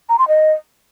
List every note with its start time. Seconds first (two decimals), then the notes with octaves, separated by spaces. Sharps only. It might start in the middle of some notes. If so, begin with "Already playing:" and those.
0.09 A#5
0.19 C6
0.28 D#5